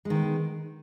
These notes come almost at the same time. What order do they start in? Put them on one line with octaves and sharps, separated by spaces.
G#3 D#3 B3